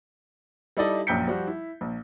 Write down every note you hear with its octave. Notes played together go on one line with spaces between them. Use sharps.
G3 D#4 E4 A4 D5 D#5
A#1 F#2 G5 G6 B6 C#7
F3 G3 F#4
E4
A#1